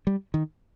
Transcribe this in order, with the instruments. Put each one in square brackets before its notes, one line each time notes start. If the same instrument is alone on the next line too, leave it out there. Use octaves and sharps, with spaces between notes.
[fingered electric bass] G3
D#3